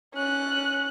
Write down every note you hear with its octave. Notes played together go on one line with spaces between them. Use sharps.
C#4 F#6